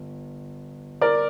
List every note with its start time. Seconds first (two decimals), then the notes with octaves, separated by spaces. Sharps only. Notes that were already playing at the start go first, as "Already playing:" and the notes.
Already playing: G1
1.01 A#4 D5